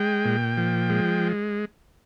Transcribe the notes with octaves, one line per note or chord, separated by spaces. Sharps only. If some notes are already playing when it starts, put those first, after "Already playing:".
Already playing: G#3 G5
A#2
F3
G#3